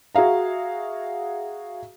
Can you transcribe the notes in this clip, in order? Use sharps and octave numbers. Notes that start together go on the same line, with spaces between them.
F#4 G#4 E5 F5 A#5